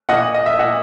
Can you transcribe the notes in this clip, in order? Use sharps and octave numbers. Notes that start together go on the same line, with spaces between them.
A#2 D#5 F#5
D#5
E5
A#2 D#5 F#5